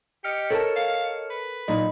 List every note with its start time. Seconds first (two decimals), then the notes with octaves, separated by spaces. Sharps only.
0.24 G4 D#5 F6 C#7
0.50 A4 A#4 C#5 A5
0.76 F5
1.30 B4
1.68 A#2 F#3 D#4 D#5 B5